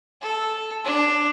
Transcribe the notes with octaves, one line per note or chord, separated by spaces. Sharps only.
A4
D4